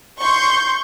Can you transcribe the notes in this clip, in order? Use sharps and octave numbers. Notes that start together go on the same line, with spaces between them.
C6 C#6 G6